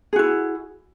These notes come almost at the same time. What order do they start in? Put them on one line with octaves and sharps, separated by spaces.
G#4 F#4 E4